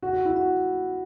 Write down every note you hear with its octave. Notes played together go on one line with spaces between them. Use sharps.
F#4
F#4
E4
F#4